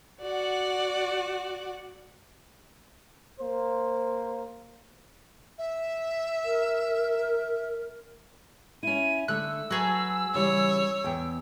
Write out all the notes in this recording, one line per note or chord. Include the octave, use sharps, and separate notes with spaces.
F#4 D5 F#5
A#3 C5
E5
A#4
C#4 E4 D#7
D3 A3 E6 F#6
F#3 F#4 G#4 B4 A5
C#3 E3 G3 C#5
E2 G5